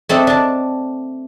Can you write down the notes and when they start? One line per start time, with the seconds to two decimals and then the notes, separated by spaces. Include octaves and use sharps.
0.09 A3 C4 D4 D#4
0.27 D4 A5